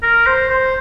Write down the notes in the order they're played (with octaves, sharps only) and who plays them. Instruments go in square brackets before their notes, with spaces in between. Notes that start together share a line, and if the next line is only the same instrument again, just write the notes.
[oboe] A#4
C5
C5